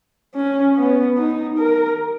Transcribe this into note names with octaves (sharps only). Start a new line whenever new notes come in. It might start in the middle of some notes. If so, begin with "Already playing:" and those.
C#4
B3
D#4
A#4